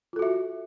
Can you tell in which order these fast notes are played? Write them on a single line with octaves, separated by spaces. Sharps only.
F4 A4 F#4 E5